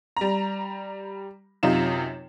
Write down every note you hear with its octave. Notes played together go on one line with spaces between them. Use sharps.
G3 A#5
F#2 C3 D#4 F4 E7